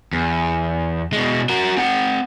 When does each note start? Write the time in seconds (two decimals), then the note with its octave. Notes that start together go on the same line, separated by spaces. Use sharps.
0.13 E2
1.13 B2 G#3
1.49 F#4 A#4
1.78 C4 F#5